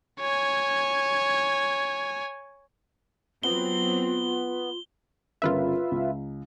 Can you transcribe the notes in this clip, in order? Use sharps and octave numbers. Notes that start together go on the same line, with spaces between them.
C#5 G#5
F#3 B3 C4 F4 G7
G1 C#3 F4 A#4 B4 E5
C#2